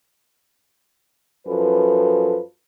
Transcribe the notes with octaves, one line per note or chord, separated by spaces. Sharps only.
F#2 F3 A4 B4